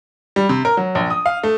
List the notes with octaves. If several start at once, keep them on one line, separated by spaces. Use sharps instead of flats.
G3
C3
A#4
F#3
A#1
D#6
F5
A3